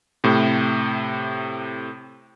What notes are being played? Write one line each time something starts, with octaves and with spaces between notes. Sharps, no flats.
A2 C3